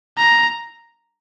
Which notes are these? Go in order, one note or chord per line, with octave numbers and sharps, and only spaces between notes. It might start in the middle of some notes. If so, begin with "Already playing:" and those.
A#5